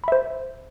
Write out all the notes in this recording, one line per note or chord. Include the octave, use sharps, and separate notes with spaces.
C5 E5 B5